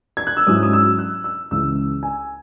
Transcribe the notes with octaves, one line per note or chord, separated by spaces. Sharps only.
G#6
F#6
E6
G#2 F#3 C#4 E4 D#6
D#6
E6
F#6
E6
C#2 C#3 E3 E6
G#5